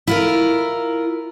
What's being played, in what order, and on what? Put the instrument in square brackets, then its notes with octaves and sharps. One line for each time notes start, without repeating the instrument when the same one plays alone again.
[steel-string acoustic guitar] E4 F4 A#4